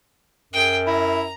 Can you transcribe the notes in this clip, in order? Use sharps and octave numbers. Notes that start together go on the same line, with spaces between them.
F#2 G#4 G5
E4 A#5